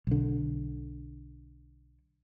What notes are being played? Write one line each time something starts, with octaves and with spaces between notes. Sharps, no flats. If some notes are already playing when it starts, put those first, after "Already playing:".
B1 D3